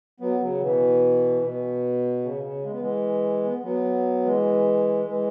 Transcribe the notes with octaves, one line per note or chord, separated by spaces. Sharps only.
F#3 B3
C#3 F#3
B2 E3
B2
C#3
C#3
G#3
B3
E3 G#3
B3
F#3 B3
E3 G#3
E3 G#3